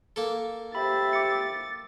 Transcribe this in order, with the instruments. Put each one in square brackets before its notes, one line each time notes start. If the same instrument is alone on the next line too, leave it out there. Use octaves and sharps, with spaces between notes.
[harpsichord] A#3 A4
[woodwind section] G4 C5 E5 [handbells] B5 [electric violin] A6
[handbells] D6 C#7